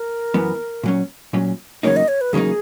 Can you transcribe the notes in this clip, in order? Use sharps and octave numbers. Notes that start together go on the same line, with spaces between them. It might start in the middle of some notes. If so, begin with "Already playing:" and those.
Already playing: A#4
F#2 E3 B3
A#2 F#3 C#4
A#2 F#3 C#4
E2 C#3 F#3 A#3 D#4 C#5
D#5
C#5
B4
E2 C#3 F#3 A#3 D#4 G#4